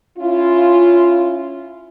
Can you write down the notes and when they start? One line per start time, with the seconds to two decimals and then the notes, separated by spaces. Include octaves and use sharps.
0.19 C#4 E4 F4